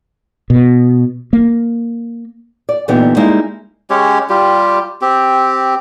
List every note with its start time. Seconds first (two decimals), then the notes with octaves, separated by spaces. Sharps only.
0.50 B2
1.33 A#3
2.69 D5
2.88 A#2 D3 E3 B3 D#4 G4
3.17 G3 G#3 A#3 D#4 E4
3.90 G#3 C#4 G4 C#5
4.29 G3 F4 G4
5.01 C4 G4